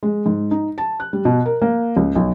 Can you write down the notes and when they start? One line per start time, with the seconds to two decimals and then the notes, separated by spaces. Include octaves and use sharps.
0.03 G#3
0.26 G#2
0.51 D#4
0.78 A5
1.00 F#6
1.13 G3
1.25 B2
1.46 A#4
1.62 A#3
1.97 C#2
2.15 B1